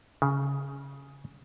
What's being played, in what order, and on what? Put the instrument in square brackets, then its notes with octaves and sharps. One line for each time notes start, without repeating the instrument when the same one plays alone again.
[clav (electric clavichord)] C#3